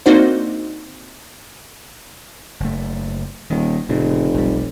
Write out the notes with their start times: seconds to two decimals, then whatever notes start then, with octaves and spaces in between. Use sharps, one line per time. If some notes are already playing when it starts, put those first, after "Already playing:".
0.06 A#3 C4 D4 D#4 F#4 C5
2.60 F#1 A3
3.50 D#1 D#3
3.89 F1 A#2 C#3
4.34 B1 G3